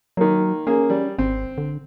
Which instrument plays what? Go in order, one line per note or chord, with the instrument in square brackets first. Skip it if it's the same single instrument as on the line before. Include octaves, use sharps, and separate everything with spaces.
[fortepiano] D#3 A#3 [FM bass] F#3
[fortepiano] A#3 G#4 [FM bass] C#4
[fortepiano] G3
[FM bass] G#1 [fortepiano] C4
[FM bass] D3